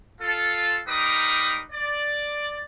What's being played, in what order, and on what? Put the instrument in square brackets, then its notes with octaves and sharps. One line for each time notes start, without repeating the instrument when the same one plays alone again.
[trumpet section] F4 A4
G3 D#4 A#4 B4 D6 D#6
D5